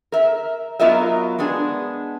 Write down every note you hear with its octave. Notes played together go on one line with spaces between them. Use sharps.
A#4 E5
F#3 B3 F4 A#4 D#5 E5
G#3 B3 D4 G#4